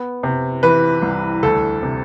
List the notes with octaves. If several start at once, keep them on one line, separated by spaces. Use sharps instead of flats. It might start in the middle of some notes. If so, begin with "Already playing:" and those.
Already playing: B3
C3
E3 B4
C2
D2 A4
C3